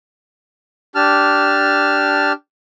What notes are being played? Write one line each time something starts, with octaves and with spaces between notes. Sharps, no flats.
D4 G4 A5 F6